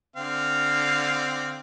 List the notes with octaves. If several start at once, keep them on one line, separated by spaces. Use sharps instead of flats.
D3 C4 F5